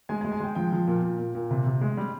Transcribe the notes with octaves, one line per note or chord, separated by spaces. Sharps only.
G#3 G#5
G#5
G#3
G#5
G#3 G5
F3 G5
F3
A#2
A#2
A#2
A#2
C3
C3
G#3
G3